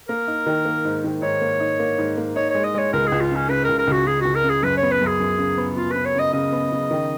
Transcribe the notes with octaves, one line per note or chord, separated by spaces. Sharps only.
A#3 A#4
D#4
D#3
A#3
G#2
D#3
G#2 C#5
A#3
D#4
A#3
G#2
A#3
D#4 C#5
G#3 C#5
D#5
G#3 C#5
C#2 A#4
G#4
C#2
F4
C#3 C#4
C#3 B4
C#2 A#4
A#4
C#2 F#4
C#3 G#4
C#2 F#4
A#4
C#3
G#4
F#2 B4
C#5
B3
B4
F#2 G#4
F#2
C#3
B3
B3 F4
B3 B4
C#5
C#3 D#5
C#3 D#5
B3
C#3
D#3